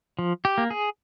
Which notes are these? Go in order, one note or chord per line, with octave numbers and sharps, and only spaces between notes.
F3
G4
A#3
G#4